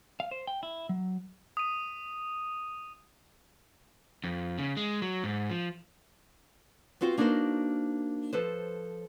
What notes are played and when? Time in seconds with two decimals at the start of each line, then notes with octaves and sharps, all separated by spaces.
0.20 F5
0.31 C5
0.47 G5
0.63 E4
0.89 F#3
1.57 D#6 D#7
4.24 F2
4.58 C#3
4.77 G#3
5.02 F#3
5.24 G#2
5.50 F3
7.01 B3 C4 F4 F#4 C5
7.18 A#3 D4 D#4 F#4 A#4 C5
8.33 F3 A4 B4 C5